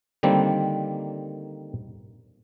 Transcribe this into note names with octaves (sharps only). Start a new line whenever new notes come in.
D3 D#3 G3 A#3 C4